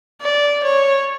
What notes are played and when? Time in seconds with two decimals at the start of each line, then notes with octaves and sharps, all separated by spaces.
0.21 D5
0.64 C#5